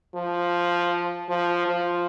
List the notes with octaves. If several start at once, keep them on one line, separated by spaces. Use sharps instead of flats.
F3
F3
F3